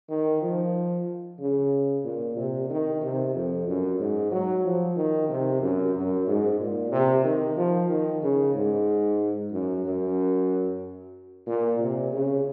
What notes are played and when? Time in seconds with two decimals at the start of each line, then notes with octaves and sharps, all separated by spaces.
0.09 D#3
0.42 F3
1.40 C#3
2.04 A#2
2.36 C3
2.70 D#3
3.02 C3
3.34 F2
3.67 F#2
3.99 G#2
4.31 F#3
4.65 F3
4.96 D#3
5.29 C3
5.62 F#2
5.95 F#2
6.27 G#2
6.60 A#2
6.91 C3
7.24 D#3
7.57 F3
7.89 D#3
8.22 C#3
8.54 G#2
9.52 F#2
9.85 F#2
11.47 A#2
11.79 C3
12.12 C#3